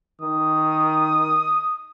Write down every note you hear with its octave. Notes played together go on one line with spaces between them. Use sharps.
D#3 D#6